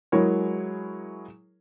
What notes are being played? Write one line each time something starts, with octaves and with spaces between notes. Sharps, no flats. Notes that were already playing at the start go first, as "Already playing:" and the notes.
F#3 G#3 E4 G#4 A#4 C#5